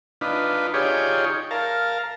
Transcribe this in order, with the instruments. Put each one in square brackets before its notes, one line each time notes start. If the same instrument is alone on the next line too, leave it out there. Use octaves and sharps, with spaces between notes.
[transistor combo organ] D4 D#4 F4 B4
D#4 F4 G4 G#4 C#5 D5
A#4 F5 A5